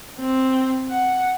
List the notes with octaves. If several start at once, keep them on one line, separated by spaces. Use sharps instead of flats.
C4
F#5